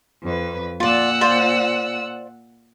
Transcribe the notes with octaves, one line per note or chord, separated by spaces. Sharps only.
F2 B4
A#2 F4 D5 F#5 E6
F4 C5 D5